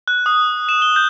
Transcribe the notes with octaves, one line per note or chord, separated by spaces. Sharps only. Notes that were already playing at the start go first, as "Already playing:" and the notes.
F#6
D#6
E7
G7
G6